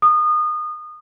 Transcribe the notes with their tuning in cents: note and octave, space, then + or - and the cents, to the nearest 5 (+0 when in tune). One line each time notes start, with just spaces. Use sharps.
D#6 -25